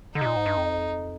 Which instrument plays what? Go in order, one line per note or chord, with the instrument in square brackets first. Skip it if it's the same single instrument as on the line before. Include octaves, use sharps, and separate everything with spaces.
[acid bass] D3 [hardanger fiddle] D#4
[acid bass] C3
A#2
G#2
G2
F2